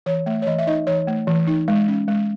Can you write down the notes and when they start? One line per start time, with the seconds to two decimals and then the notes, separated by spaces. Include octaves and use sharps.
0.06 E3 C#5
0.26 A3 E5
0.42 C#5
0.47 E3 D#5
0.58 E5
0.67 D#4 D#5
0.87 E3 C#5
1.07 A3
1.27 E3
1.47 D#4
1.68 G#3
1.88 C#4
2.08 G#3